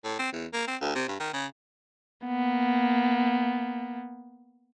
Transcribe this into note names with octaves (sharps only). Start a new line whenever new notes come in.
A2
C4
E2
A#3
C4
D2
C3
G2
D#3
C#3
A#3 B3